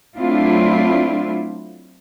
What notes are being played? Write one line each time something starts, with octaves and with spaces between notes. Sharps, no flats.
F#3 A3 C4 D4 E4 F4